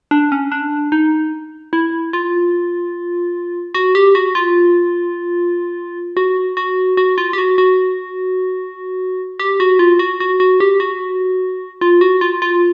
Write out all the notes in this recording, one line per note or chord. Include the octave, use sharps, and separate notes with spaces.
D4
C#4
D4
D#4
E4
F4
F#4
G4
F#4
F4
F#4
F#4
F#4
F4
G4
F#4
F#4
G4
F#4
F4
F#4
F#4
F#4
G4
F#4
F4
F#4
F4
F4